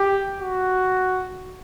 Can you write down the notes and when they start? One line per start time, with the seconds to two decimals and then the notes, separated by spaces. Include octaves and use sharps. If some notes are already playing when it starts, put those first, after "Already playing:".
Already playing: G4
0.41 F#4